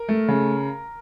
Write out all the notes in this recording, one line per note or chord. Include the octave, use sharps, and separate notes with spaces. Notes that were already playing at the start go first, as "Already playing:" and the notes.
Already playing: A#4
A3
C#3